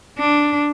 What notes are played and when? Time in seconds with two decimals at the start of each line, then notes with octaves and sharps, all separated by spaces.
0.19 D4